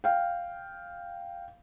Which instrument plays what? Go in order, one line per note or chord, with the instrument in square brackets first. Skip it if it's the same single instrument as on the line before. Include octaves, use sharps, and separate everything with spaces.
[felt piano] F5 G5